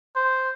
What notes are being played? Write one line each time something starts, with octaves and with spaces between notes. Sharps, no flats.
C5